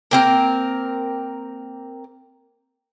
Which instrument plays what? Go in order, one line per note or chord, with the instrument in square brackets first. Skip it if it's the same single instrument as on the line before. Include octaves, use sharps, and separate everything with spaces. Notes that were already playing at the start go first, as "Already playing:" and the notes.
[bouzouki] A#3 C4 A#4